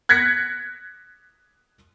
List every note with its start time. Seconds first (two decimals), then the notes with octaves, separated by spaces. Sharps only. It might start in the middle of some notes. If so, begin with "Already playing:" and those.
0.09 F#6 G#6 A#6 B6 C#7